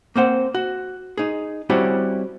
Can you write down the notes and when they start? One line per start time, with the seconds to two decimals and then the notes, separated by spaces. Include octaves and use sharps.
0.16 A#3 C4 C5 F#5
0.55 F#4
1.18 D#4 G#4
1.70 G3 C4 C#4 E4 F#4 G4